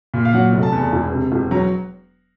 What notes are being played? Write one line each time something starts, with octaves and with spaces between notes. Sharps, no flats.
A#2
F5
F#3 F#5
F1
A5
E2
E1
C3
E1
F#3 A#5